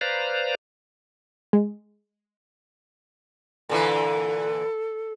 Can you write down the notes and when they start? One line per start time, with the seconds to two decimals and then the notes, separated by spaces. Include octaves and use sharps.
0.01 B4 C5 D5 F5 A#5
1.53 G#3
3.69 A#2 D3 E3 A4